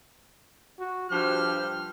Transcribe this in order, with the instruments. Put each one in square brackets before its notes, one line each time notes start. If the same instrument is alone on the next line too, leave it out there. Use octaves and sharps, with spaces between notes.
[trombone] F#4
[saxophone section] G2 G4 C5 [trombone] F3 [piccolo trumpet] F6